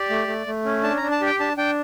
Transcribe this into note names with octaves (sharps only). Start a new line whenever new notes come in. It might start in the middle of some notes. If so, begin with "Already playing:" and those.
Already playing: G4 D5
A3
A3
A3
C#4
D4 A5
A#5
D4
A5
G4
G5
D4 A5
D4 G5